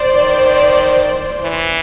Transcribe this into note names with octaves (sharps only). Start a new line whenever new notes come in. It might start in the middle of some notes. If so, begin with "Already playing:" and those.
Already playing: C5 D5
D#3
E3